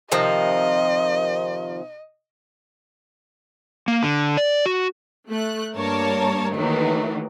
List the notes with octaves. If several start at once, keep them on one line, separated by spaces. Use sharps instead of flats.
C3 D#3 F3 D#5
A#3
D3
D5
F#4
A3 F#6
G2 A#3 A#4 C#5 A5
D#2 D#3 E3 F#3 A3